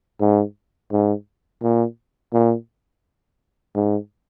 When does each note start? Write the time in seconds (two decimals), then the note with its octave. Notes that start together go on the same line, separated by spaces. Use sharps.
0.21 G#2
0.92 G#2
1.63 A#2
2.33 A#2
3.75 G#2